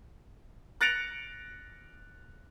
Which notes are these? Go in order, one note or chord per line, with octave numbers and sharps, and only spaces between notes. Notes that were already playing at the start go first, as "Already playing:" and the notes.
F#6 A6 A#6 C#7 D7 F7